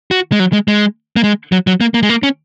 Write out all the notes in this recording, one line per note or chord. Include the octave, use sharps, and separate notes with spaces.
F#4
G#3
F#3
G#3
G#3
A#3
G#3
F#3
F#3
A#3
A#3
G#3
A#3
C#4